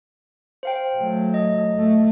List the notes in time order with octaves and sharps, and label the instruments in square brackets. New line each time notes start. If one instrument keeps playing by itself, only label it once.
[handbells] C5 F5 G5
[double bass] F#3 A3
[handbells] D#5
[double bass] A3